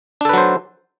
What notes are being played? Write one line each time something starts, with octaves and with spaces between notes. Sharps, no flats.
F#3 D4 A4 B4 C5